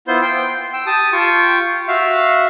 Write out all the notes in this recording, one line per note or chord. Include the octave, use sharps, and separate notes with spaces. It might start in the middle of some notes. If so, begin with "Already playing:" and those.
B3 E4 F4 C5 C6 G6
G5 C6
G5 E6
G4 A5 D#6
F4 G4 G5 C#6
F#4 E5 F5